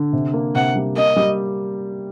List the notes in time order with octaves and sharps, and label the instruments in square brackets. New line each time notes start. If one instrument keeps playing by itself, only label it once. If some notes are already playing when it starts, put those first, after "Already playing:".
Already playing: [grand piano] D3
C3
A#3
[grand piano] C3 [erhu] F#5
[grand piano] G3
[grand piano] A#3 [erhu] D#5
[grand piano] G3